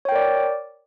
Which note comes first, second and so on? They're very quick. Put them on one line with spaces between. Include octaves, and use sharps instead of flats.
C#5 G5 A#4 D5